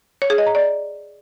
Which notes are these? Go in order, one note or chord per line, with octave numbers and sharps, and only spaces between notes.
C#5
G#4
D#5
A#5
D5